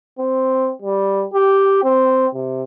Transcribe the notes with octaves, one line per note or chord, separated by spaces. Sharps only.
C4
G3
G4
C4
C3